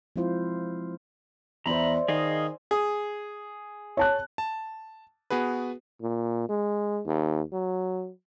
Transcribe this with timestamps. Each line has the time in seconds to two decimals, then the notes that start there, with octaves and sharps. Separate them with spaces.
0.16 F3 G#3 C4 E4 F4 C5
1.66 E2 C5 D5 E5 A#5 B5
2.08 D#3 G#4 D#5 F5
2.71 G#4
3.97 C#5 A5 F#6
4.38 A5
5.30 B3 F#4 G#4 B4
6.02 A#2
6.49 G#3
7.06 D#2
7.52 F#3